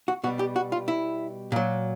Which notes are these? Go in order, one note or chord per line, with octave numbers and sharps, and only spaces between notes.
F#4
B2 G3 F#4
G4
F#4
F4
E4
A#2 F#3